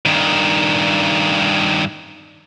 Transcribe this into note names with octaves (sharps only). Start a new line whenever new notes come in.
G2 D#3